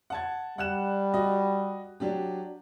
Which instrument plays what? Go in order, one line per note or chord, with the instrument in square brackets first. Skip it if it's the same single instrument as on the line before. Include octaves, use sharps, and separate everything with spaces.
[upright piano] F#5 A5 G#6
[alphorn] G3 [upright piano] F#5 F#6 E7
[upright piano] F#4 D#5
F#3 D4 G4